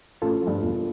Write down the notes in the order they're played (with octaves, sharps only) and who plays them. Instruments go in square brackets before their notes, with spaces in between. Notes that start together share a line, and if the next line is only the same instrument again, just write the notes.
[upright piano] A1 [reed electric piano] F4 A4
[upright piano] G2 F3
E1